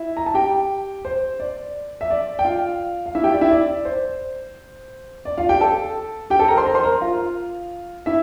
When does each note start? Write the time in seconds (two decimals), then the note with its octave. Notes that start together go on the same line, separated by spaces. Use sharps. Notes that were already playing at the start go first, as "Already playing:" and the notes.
Already playing: E4 E5
0.17 A#5
0.26 A5
0.34 G4 G5
1.05 C5
1.40 D5
2.01 E5
2.10 D5
2.39 G5
2.45 F4 F5
3.06 F5
3.15 E4 E5
3.24 G4 G5
3.32 D5
3.41 E4 E5
3.51 D5
3.85 C5
5.25 D5
5.38 F4 F5
5.49 G4 G5
5.61 A4 A5
6.30 G4 G5
6.39 A4 A5
6.48 A#4 A#5
6.57 C5 C6
6.66 A#4 A#5
6.75 C5 C6
6.83 A#4 A#5
7.01 F4 F5
8.06 E4 E5